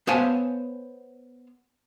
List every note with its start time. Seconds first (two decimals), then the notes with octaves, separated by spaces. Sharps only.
0.07 B3 C5 C#5 F5 G#5 A5